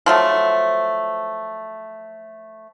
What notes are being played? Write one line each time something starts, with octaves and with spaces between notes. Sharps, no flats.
F3 F#3 A3